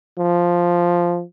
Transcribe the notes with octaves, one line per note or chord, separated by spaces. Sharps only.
F3